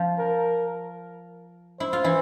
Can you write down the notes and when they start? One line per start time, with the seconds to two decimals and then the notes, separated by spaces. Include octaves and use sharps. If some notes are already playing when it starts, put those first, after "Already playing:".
Already playing: F3 F4
0.18 A#4
1.80 E4 C5
1.93 F4
2.04 E3 E4